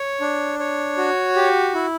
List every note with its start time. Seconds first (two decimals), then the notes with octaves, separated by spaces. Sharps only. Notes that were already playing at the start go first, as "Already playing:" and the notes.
Already playing: C#5
0.21 D4
0.59 C#5
0.98 F#4
1.36 G4
1.74 E4